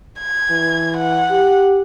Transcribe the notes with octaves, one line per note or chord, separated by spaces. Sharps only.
G#6
E3
F#5
G4